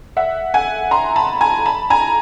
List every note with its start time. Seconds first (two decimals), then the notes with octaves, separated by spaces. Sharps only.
0.17 E5 F#5
0.54 F#5 G#5
0.91 A#5 C6
1.16 A5 B5
1.41 G#5 A#5
1.66 A5 B5
1.90 G#5 A#5